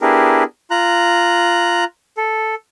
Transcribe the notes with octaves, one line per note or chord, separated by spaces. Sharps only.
B3 D4 E4 G4 G#4 A#4
F4 A#5 F#6
A4